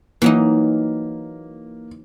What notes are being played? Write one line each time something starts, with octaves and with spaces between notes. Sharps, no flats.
E3 F#3 A#3 D#4